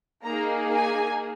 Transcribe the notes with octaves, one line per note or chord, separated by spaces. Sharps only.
A#3 D#4 G#4 A#5
G#5